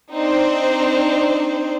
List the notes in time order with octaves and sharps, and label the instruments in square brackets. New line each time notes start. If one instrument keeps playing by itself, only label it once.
[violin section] C4 D4 D#4 C5